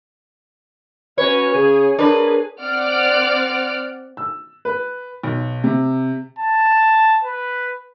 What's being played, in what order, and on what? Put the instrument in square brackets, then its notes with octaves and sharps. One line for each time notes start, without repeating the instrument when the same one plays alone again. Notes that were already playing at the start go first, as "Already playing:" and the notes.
[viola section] C#4 F#4 G#5 [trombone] B4 [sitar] C#5
[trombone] C#3 [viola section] G#4
[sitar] D4 B4 [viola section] G#4 [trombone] A#4
[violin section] C4 D5 F#5 F6 D7
[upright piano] E6
B4
B1
C3
[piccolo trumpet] A5
B4